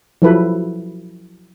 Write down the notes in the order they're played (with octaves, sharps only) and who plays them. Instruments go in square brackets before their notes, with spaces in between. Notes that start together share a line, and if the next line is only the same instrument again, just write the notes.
[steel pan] F3 F#3 E4 A4 B4